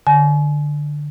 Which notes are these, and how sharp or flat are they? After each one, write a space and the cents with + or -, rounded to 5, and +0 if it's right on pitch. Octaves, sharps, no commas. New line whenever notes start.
D3 +10 G#5 +40